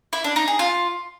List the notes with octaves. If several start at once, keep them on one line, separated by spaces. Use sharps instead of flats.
E4
D4
D#4
G#4
F4